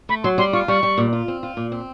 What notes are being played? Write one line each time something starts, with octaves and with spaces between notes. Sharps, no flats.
A3 B5
F#3 C6
G3 C6
F4 C#6
G3 C#6
G3
A#2
F4
C4
F4
A#2
C4